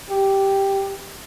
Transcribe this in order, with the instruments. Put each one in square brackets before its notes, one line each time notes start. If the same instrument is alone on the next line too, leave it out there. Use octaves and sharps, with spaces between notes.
[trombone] G4